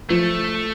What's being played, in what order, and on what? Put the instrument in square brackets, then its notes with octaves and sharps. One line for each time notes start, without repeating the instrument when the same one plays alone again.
[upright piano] F3 [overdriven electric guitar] A3